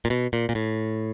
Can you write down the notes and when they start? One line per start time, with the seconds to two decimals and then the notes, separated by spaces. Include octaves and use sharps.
0.05 A#2
0.10 B2
0.33 A#2
0.49 A#2
0.55 A2